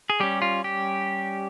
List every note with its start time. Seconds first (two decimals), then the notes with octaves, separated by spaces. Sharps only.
0.10 G#4
0.20 G3 C#4 G4
0.42 F4
0.64 G4